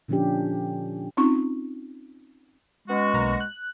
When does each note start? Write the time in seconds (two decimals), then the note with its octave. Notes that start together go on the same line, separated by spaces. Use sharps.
0.08 A#2 D3 F3 C#4 D4 G4
1.17 C4 C#4 D#4 F4 C#6
2.88 G#3 B3 C#4 F#4
3.14 B1 A#3 A#5
3.40 F#6